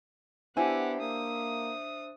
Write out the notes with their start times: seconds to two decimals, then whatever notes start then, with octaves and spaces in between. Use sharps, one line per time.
0.57 B3 D4 E4 G4 C5 E5 F#5 G#5
1.01 A#3 D#6